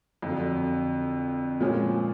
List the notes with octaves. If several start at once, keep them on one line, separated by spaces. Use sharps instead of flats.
F2 D3 F#3
A#2 F3 G#3 C#4